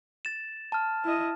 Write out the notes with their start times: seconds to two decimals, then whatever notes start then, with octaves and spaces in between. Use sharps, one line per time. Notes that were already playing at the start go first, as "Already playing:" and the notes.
0.25 A6 E7
0.72 A5 F6
1.04 E4 D#5